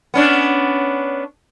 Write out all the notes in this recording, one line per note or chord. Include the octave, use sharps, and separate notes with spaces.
B3 C#4 D4